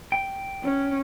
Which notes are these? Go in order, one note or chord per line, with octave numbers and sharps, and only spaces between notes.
G5
C#4